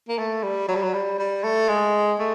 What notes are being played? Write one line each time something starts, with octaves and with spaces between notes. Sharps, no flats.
A#3
A3
G3
F#3
G3
F#3
G3
G3
A3
G#3
A3